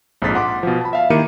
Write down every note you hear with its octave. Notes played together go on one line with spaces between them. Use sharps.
A#1 F2 G#2 D#6 A6 B6
F#5 C6 D6
B2 F3
A5 B5
E5 F5
D#3 A#3 E4 G4 C#7 D#7